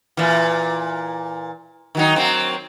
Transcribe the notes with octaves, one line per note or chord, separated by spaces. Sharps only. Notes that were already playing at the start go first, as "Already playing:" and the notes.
A#2 E3
D#3 F#3 D#4
F#3 A#3 C4